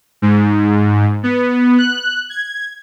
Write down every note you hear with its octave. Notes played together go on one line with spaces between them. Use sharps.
G#2
B3
F#6
G#6